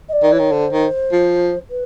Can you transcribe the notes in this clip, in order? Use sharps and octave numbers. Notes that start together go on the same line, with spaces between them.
D#5
D5
D#3
E3 C#5
D#3
D3 C5
D#3
F3
B4